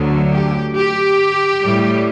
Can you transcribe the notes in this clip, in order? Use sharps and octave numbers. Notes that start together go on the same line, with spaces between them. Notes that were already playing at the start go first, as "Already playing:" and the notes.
Already playing: D2 D3 F#3
G4
G4
A2 G3